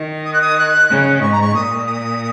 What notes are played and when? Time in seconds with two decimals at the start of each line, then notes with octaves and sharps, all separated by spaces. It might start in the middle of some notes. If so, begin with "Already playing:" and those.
Already playing: D#3
0.25 D#6
0.33 F#6
0.41 D#6
0.58 F#6
0.90 C#3
1.22 G#2 C#6
1.32 A#5
1.41 C#6
1.54 A#2 D#6
1.86 D#6